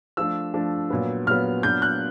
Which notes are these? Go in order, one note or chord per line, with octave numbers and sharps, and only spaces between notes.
F3 A3 D4 E6
F3 A3 D4
A#2 F#3 B3
A#2 F#3 B3 F6
A#2 F#3 B3 D4 G6
F#6